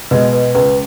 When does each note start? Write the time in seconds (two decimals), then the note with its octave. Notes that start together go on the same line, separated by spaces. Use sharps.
0.11 B2 G#3 B4
0.33 B4
0.55 C#2 B4